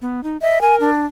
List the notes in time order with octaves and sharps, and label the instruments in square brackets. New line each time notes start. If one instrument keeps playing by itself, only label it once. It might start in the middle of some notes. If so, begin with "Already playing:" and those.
[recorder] B3
D#4
[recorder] D#5 [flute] E5
[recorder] A#4 [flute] G#5
[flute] D4